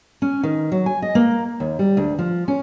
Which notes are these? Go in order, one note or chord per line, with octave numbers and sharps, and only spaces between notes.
C#4
D#3
F#3
G#5
D#5
A#3
D#2
G3
D2
F3
C#4